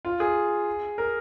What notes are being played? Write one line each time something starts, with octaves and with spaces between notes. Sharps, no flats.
F4
G#4
A#4